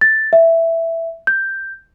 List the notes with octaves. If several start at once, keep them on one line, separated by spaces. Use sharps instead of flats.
A6
E5
G6